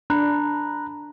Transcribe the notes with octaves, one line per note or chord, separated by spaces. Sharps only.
D4 A#5 B5 F#6